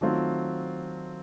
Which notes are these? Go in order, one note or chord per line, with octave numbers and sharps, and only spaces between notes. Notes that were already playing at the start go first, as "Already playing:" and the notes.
D#3 F#3 A3 C4 F4